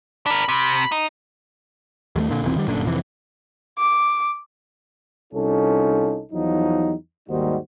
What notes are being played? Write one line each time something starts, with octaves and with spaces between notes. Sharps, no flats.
D4 A#4 B5
C3 B5
D#4
D#2 G#3 A3
A#2 D3
F1 B1 E3 C4
D#3 G3
G1 F#2 A#2 D3
F2 C3 E3
D6
C2 C#4 D#4 F4 A4
E2 F3 F#3 D#4
D#2 G#2 G3 D#4 F#4 C5